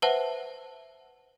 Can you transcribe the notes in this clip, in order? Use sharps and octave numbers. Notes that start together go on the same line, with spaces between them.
B4 C5 E5 F#5 A5